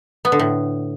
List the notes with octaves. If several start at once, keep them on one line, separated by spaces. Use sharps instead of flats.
B3
D3
A2